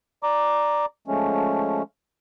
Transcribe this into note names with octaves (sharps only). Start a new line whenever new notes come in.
D5 A#5 D6
F3 G#3 A3 C#4